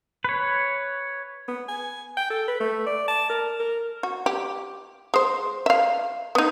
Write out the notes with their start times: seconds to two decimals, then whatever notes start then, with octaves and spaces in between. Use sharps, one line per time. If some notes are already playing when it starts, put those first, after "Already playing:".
0.25 B4 C#5
1.48 B3
1.68 G#5
2.17 G5
2.30 A4
2.48 B4
2.60 A3
2.86 D5
3.08 A5
3.30 A#4
3.59 A#4
4.03 F#4
4.26 G4
5.14 G#3 C5
5.66 E5 F5
6.35 B3 D#4